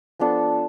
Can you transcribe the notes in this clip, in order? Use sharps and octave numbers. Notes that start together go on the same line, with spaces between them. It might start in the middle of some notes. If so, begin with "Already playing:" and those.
F3 B3 D4 A4